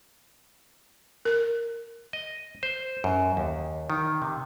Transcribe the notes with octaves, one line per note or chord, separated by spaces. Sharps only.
A#4
D#5
C5
F#2
D#2
D#3
C3